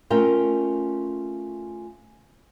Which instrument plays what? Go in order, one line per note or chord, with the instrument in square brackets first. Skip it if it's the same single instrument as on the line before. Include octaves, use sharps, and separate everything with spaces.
[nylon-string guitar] A3 C#4 F4 A#4 E5 G5